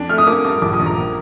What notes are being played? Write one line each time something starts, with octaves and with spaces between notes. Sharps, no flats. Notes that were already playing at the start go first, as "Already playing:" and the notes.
Already playing: F2 D4
A3 F6
D#6
A#3 D6
G2 D6
A#1 D6
D#6
A#1
A#5
A#3